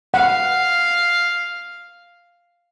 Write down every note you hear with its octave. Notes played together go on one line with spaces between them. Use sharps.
F5 F#5